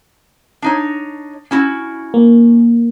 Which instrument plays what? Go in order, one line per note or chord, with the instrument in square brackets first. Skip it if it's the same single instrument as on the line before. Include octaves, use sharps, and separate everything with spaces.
[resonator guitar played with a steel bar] D4 D#4 C#5
C#4 E4 F#4
[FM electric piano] A#3